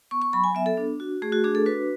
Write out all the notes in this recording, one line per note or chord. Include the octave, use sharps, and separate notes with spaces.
B3 C#6
C#6
F#3 B5
G#5
B3 E5
A4
D4
F#4
A3 G#4
F#4
D4 G#4
A4
F#4 B4